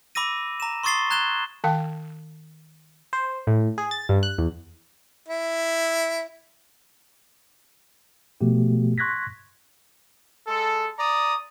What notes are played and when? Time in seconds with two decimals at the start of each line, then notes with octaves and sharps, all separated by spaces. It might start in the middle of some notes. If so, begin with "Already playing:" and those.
0.15 B5 D6 E6 A#6 D#7
0.60 A#5 E7
0.83 C6 C#6 D#6 A6 C7 G7
1.10 A#5 F#6 G#6 E7 G7
1.64 D#3 F5 G5
3.13 C5
3.47 A2
3.78 G#4
3.91 A6
4.09 G2
4.23 F#6
4.38 E2
5.28 E4
8.41 B2 F3 A3 B3 F#4 G4
8.98 C6 C#6 F#6 G#6 A#6 B6
10.47 G#3 A4
10.98 D5 A#5 D#6